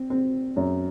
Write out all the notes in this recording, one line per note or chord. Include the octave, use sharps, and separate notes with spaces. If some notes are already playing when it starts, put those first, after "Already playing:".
Already playing: C4
C4
F#2